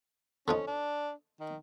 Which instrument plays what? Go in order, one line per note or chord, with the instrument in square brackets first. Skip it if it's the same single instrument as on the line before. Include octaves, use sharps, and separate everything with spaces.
[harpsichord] D3 F3 D#4 [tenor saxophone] C#4
[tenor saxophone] D4
D#3